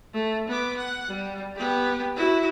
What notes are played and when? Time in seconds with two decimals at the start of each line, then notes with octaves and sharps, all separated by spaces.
0.13 A3
0.48 B3 D6
0.77 F#5
1.08 G3
1.56 B3 G4
2.16 E4 F#4